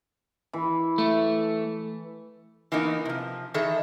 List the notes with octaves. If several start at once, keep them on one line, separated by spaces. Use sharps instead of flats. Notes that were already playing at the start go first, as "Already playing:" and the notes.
E3
A3
E3 A#3 B3 D#4 A#4
C3 F3
D#3 E3 G#4 A4 D#5 E5